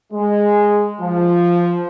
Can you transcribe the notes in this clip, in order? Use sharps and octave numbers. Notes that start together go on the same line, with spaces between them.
G#3
F3